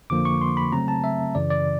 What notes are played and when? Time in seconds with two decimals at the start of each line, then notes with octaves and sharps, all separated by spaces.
0.10 F2 D3 F3 A#3 D6
0.25 C#6
0.41 C6
0.57 B5
0.72 C#3 F#3 A3 C4 A#5
0.88 A5
1.04 E5
1.35 F#2 C#3 E3 D5
1.50 D5